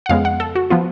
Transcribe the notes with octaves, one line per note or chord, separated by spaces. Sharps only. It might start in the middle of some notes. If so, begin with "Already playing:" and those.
F#5
F2 C#3 G#3 B3 F5
F#5
A4
F#4
F3 B3 F4